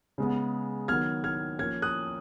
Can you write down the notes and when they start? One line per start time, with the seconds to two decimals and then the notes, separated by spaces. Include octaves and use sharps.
0.18 C#3 G#3 B3
0.88 D#3 F#3 B3 F6 G#6
1.24 F6 G#6
1.58 F3 A#3 C#4 F6 G#6
1.82 D#6 F#6